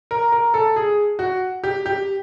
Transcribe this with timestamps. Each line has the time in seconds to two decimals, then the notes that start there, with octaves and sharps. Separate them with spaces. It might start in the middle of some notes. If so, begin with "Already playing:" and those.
0.11 A#4
0.32 A#4
0.54 A4
0.76 G#4
1.19 F#4
1.64 G4
1.86 G4